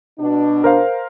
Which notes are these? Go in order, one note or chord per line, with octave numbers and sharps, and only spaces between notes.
B2 D4
A#4 C5 F5